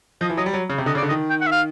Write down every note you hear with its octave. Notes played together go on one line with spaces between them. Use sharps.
F3 D#5
E3
F#3 D#5
G3
F#3
C#3
C3
D3 D#5
C#3
D5
D3
D#3 D#5
G5
F#5
E5
F5